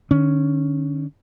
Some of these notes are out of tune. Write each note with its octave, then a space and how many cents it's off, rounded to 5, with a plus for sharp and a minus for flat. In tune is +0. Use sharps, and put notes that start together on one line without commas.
D3 +45 C#4 +0